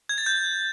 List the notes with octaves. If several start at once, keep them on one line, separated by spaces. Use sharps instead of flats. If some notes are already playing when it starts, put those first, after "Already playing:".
G#6
A6
G6